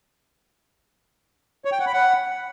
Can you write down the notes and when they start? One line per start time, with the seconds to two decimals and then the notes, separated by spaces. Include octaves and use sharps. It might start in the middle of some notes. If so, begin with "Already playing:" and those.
1.65 C#5
1.72 G5
1.79 F#5
1.86 B5
1.94 F#5